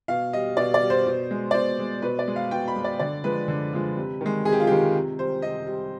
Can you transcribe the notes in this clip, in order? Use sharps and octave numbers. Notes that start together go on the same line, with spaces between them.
B2 F5
G3 D#5
B2 D5
D5
G3
C5
B2
G#3
D5
B2 C5
G#3
B2 B4
D5
G#3
F5
B2 G5
B5
G#3
D5
D3 D5
F3 G#3 B4
D3
F3 G#3
C3
D#3 G#3
C3 G#4
G4
F4
D#3 G#3 G4
C3
G3 C5
C3 D#5
G3